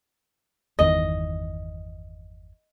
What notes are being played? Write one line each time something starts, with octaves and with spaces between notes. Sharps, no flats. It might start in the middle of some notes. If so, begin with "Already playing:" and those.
G1 E2 D#3 D#5